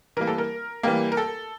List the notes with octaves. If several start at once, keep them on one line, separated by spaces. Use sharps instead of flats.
E3 G3 A#3 A#4
A4
A#4
E3 G3 A#3 G4
A#4
A4